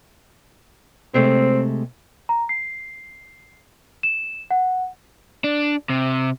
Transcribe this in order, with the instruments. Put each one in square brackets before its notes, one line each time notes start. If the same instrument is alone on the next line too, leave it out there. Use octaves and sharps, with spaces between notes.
[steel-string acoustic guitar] C3 G#3 A3 [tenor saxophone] C4
[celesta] A#5
C7
E7
F#5
[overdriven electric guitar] D4
C3